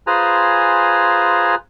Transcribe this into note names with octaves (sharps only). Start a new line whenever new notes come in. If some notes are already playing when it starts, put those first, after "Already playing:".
F4 G#4 B4 C5 G#5 A#5